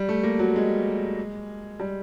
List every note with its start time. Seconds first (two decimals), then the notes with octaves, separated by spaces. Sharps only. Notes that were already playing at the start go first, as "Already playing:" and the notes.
Already playing: G3
0.09 A3
0.23 A#3
0.39 F#3
0.56 G#3
1.80 G3